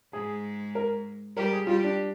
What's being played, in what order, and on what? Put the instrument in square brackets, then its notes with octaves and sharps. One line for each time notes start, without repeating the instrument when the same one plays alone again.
[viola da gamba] G#2 G#3 [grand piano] G#4
[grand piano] A#4
[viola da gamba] G3 G4 [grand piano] A#4
[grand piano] G#4
[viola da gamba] G3 G4 [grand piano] F4
[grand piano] D4